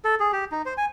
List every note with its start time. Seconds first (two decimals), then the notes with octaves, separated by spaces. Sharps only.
0.05 A4
0.20 G#4
0.33 G4
0.52 D#4
0.66 C5
0.77 G#5